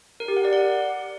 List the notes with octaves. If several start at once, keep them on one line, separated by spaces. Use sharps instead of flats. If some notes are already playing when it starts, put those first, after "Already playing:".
A#4
G4
F#5
D5
F#5